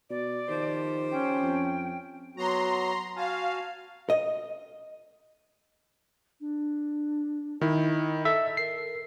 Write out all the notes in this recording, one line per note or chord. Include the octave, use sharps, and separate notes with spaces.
B2 D5
D#3 F3 G4 C5
C#4 G5
F2
F#3 B3 F#4 A#5 C6
F#4 F5 G#5 A5
D#5
D4
D#3 E4 D#5
A4 D#5 E5
A#4 C7